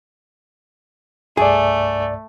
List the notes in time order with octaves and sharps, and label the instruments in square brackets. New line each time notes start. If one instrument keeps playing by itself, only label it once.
[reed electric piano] C2 G2 D5 [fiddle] A3 [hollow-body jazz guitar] G#4